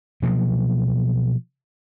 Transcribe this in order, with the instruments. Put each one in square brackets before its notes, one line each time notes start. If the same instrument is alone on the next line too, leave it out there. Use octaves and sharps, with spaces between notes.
[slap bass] B2 F3 F#3 A#3